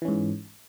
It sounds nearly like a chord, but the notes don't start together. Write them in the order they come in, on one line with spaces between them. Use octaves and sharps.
E3 C#4 G#2